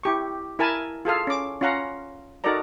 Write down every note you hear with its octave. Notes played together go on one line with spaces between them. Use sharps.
E4 G4 C#6
E4 A#4 G#5 A5 B5
F4 G#4 A4 F5
C#4 D6
C#4 F4 F5 F#5 A#5
D#4 F#4 A4 A#4 D5 A#5